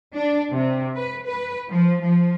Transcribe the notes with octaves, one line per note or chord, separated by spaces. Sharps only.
D4
C3
B4
B4
F3
F3